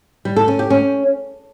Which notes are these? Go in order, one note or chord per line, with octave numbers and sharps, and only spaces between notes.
G3
A4
C#4
G4
C#4